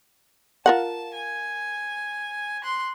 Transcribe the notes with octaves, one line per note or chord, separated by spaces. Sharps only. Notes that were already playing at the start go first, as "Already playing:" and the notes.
F4 A#4 F#5 A5
G#5
C6 F#6